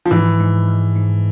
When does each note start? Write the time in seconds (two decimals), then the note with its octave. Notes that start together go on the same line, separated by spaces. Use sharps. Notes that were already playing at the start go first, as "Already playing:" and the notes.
0.06 F3
0.11 G#2 E3
0.40 G#2
0.68 G#3
0.96 G#2